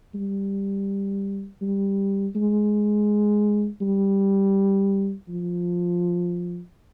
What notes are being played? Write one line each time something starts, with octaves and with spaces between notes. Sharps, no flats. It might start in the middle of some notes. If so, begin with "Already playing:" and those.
G3
G3
G#3
G3
F3